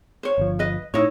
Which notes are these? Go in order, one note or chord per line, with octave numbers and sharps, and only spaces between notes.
C5 C#5
G1 F3
B4 D#5
A2 D#4 E4 C#5